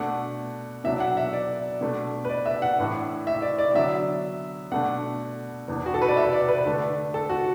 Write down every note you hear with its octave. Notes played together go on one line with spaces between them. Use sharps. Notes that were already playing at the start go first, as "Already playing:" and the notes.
Already playing: B2 A3 D4 F#5
B2 F#3 D4 E5
F#5
E5
D5
B2 A3 D4
B4
D5
E5
F#5
A2 E3 D4
E5
D5
D5
D3 F#3 B3 E5
B2 A3 D4 F#5
E2 B2 B3 D4
F#4
A4
B4
D5
E5
D5
B4
D3 A3 D4
A4
F#4